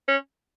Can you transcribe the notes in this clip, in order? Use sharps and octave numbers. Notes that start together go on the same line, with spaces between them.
C#4